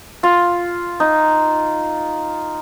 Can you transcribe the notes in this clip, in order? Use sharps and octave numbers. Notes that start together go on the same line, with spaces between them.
F4
D#4